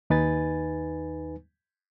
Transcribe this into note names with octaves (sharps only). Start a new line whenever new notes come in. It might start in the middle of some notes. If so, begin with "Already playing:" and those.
D#2 D#4 B4 G#5 A6